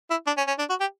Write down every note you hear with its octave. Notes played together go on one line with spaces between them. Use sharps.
E4
D4
C#4
C#4
D4
F#4
G4